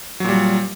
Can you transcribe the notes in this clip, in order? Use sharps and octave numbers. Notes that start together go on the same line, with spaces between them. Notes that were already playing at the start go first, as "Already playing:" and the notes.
A#2 F#3 G3